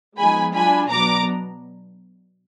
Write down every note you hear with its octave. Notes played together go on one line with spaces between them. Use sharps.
F3 G#3 B3 D#4 G#5 B5
F#3 D4 F4 G#5 B5
B2 F#3 B3 D4 A#5 D6